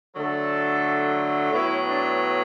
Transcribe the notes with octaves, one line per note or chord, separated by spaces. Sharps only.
D3 F#3 A3 A4
A2 F#3 B3 E4
D4